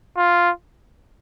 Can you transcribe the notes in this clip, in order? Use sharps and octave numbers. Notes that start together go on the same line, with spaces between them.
F4